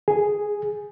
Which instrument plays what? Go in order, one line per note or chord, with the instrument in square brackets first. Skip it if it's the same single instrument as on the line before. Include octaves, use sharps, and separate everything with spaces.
[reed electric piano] G#4